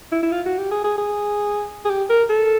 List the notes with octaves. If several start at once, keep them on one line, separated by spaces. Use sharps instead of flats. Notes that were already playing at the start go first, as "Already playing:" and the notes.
E4
E4
F4
F#4
G4
G#4
G#4
G#4
G#4
G4
A#4
A4